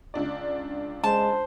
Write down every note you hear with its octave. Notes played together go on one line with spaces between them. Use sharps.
C#2 D4 D5
G#3 C5 A5